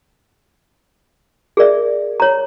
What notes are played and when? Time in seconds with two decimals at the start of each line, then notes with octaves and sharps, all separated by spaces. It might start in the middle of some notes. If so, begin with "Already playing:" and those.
1.57 G#4 A#4 D5 E5
2.20 C#5 A#5